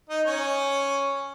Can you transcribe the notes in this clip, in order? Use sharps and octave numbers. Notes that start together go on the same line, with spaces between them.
D#4 D#5
C#4 C#5